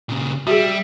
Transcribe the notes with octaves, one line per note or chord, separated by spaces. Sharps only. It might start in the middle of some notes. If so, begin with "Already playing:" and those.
A#2 C#3
G3 F#4 G#4 E5